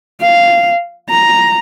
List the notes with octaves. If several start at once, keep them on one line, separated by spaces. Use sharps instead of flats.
F5
A#5